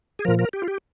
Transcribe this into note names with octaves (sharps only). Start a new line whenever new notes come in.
G#4
A#2 F3 A#4
A#4
G4
F4
G4